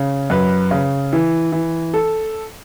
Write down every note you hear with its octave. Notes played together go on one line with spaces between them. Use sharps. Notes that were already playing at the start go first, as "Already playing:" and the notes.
Already playing: C#3
F#2 B4
C#3
E3
E3
A4